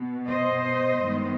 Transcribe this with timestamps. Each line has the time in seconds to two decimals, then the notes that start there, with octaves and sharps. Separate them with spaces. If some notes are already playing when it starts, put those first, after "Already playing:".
Already playing: B2 B3
0.28 C5 D#5
1.00 G2 D#3 G#3 B3